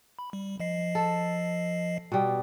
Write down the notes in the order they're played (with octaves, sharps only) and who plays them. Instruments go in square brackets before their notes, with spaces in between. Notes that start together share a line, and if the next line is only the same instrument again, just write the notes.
[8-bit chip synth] B5
G3
F3 D#5 C7
[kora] A4
B2 G3